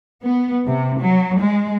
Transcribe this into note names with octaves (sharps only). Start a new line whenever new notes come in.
B3
C3
F#3
G#3